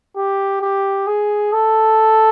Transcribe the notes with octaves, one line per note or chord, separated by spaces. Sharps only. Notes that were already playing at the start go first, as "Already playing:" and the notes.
G4
G4
G#4
A4